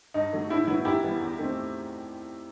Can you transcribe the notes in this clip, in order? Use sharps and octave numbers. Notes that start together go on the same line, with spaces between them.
G2 D#4
F#3 A3
A2 E4
F#3 B3 E4
F#2 E4 G4
E3 G3 B3
E2
D#3 A3 C4